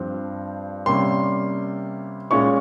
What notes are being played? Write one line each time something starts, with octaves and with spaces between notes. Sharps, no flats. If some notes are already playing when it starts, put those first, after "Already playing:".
Already playing: G2 F3 C4
C3 G3 A#3 C#4 C6
A#2 G#3 C#4 C#6